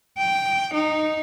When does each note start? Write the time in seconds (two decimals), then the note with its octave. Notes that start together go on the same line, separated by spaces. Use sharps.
0.18 G5
0.74 D#4